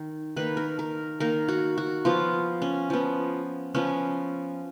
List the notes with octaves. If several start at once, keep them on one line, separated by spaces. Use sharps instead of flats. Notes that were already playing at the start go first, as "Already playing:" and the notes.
Already playing: D#3
D#3 A#3 B4
A#4
A#4
D#3 A#3 A#4
F#4
F#4
F3 B3 F4
C#4
F3 B3
F3 B3 C#4